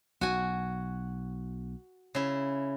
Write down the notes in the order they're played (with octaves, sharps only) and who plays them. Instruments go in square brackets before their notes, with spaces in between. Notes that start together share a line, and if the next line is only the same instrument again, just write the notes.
[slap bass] B1 [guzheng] F#4 G#5
[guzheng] C#3 E4